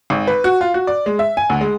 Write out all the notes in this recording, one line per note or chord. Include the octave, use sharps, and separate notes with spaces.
G#1
B4
F#4
F4
F#4
D5
G#3
E5
G#5
D2
G#3